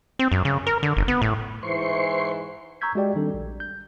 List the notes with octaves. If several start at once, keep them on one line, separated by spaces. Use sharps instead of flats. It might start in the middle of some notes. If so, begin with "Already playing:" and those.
C4
F#2
C#3
A#4
D3
G1
B3
A2
G#2 E3 C5 C6 C#6
A#5 C#6 E6 G6 G#6 B6
G#3 F#4 G4 D5 G5
D#3 G3 C4 D4 A4
A#1
G6